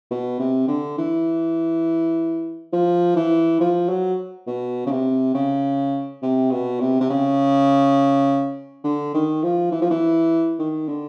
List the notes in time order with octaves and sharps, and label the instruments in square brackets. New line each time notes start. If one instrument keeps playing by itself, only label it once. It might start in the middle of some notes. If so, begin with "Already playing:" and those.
[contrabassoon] B2
C3
D3
E3
F3
E3
F3
F#3
B2
C#3
C3
C#3
C3
B2
C3
C3
C#3
D3
D#3
F3
E3
F3
E3
D#3
D3